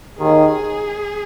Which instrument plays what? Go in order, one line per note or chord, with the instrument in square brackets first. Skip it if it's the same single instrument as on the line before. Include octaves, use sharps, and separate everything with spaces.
[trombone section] D#2 D#3 [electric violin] G#4